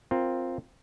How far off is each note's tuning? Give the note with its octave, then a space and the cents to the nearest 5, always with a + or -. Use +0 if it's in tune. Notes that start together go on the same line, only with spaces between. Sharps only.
C4 +0 F4 +0 A#4 +0